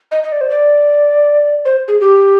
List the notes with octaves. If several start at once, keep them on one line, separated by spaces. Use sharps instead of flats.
D#5
D#5
D5
C5
D5
C5
G#4
G4